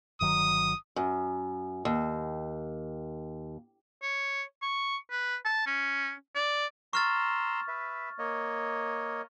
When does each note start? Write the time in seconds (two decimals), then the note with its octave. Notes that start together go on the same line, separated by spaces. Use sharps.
0.21 G1 D#3 F#3 D#6
0.96 F#2
1.85 D#2
4.02 C#5
4.62 C#6
5.11 B4
5.45 A5
5.67 C#4
6.35 D5
6.93 A#5 C6 C#6 E6 F6 A6
7.68 B4 E5
8.19 A#3 C#5 D#5